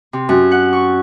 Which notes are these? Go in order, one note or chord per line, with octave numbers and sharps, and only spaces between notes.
C3
F#2
F#5
C#6